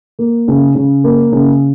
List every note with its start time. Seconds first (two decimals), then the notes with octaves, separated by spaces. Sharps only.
0.19 A#3
0.48 C#3
0.75 C#3
1.04 A#3
1.32 C#3